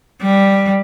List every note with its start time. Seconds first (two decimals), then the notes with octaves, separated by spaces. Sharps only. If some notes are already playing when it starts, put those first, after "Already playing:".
0.22 G3